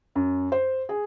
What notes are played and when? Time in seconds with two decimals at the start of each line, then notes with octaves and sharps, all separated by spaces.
0.15 F#2
0.52 C5
0.89 G#4